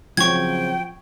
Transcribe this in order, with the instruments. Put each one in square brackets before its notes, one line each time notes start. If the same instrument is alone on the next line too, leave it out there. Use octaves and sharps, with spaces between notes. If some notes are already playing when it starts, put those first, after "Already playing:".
[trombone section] C#3 F#3 C4 [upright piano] F3 [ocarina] G5 [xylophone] C#6 G#6